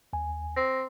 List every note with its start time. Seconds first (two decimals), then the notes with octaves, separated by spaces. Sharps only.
0.13 D#2 G#5
0.56 C4 A#6